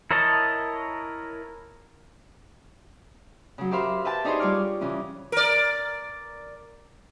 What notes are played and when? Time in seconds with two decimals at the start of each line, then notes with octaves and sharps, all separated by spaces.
0.11 E4 A#4 C#5 D#5 A5
3.58 C#3 F#3
3.71 G4 A#4 C5 E5 F5 B5
4.05 B4 E5 G5 A5 B5
4.24 D4 D#4 G4 G#4 C5 C#5
4.39 G3 F4 C#5 D6 F6
4.81 C#3 E3 C#4
5.32 A#4 D5